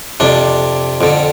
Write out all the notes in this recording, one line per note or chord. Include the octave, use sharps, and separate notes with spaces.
F2 C3 D4
F2 D3